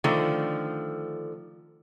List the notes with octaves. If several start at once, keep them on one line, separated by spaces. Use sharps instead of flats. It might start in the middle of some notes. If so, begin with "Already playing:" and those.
D3 D#3 F3 A3